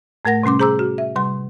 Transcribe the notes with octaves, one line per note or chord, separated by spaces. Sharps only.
A2 A3 A#4 F#5 A#6
C3 G3 C#4 C6 D6
G#4 C5 A#5 D6 E6
F#4
E5
C3 G3 C6